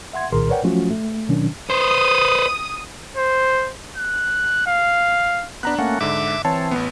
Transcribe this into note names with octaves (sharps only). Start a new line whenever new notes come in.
E5 F#5 C6 G#6
C2 A#2 D#3 G#4 A#4 C6
A#4 B4 C#5 D5 F#5 G5
F3 F#3 A3 C#4 F4 F#4
A3
B2 D#3 F#3 C#4 D4
B4 C5 D#6
C5
F#6
F5
B3 D4 A#5 F#6
A3 A#3 C#4 F#5
G#2 D3 E5 D6
E3 C4 C#5 A5
A1 B3